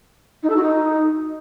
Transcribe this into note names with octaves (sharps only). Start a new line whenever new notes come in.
D#4
A4
F#4
D#4